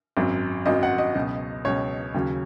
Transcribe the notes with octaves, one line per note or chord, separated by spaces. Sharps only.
G#1 F#2 F#3
G#1 F#2 F#3 D#5
F#5
D#5
C#2 B2 F#3
C#2 B2 F#3 C#5
D#2 C#3 F#3